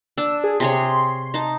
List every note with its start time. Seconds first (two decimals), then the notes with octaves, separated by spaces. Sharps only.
0.18 D4 E6
0.44 G#4
0.60 C3 G#4 C#5 C6
1.34 D#4 A5